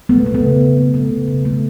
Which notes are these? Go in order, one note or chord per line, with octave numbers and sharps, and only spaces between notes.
A3 B3
A3
B3
C#3
C#3
A3
A3
C#3
C#3
A3